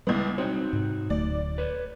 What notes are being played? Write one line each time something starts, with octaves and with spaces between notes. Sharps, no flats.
C#2 E3 G3 B3
C4 D#4 F#4 C#5
G#2 C3
D1 D2 A3 D5
B4 C#5